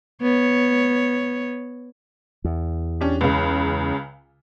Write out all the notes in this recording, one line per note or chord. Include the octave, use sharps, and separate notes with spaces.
B3 C#5
E2
C#4 D4 G4
C#2 C#3